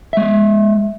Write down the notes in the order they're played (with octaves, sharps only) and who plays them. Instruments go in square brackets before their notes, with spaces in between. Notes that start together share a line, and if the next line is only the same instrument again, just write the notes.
[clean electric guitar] G#3 E5